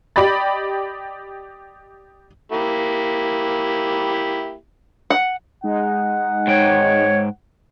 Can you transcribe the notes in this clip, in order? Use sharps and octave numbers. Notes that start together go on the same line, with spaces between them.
G4 D5 D#5 B5 A6
A#3 E4 G4
F#5
G#3 D#4 F#5
G#2 C#5 G5